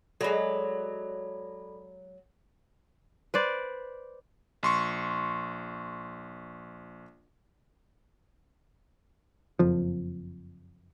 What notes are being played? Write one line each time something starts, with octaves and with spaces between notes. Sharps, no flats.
F#3 G#3 A4 D5 B5
B4 C5 D5
A#1 C6 C#6
F#1 F2 F3